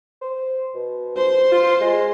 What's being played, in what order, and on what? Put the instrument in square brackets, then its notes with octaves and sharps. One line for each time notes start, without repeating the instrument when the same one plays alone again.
[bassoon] C5
B2
[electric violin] C5 C6
[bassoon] F4
G#3